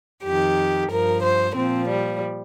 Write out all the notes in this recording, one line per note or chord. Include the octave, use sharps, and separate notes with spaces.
F2 D#3 G4
G2 F3 A#4
C5
A#2 F3 C4
G3